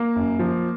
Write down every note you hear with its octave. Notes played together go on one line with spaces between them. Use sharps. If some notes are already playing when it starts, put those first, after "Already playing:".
Already playing: A#3
F#2
F3